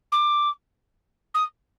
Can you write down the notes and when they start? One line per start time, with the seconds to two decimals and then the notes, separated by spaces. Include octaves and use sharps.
0.12 D6
1.34 D#6